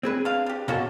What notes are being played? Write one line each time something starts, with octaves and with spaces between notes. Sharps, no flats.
C4 G#4 B4
D4 F5
D4 G4
B2 A#3 C#4 F#4 A4 A5